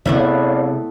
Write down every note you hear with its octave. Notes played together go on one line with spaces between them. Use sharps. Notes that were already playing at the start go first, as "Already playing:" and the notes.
C3 G#3 A3 B3 E4 C#5 D5 F5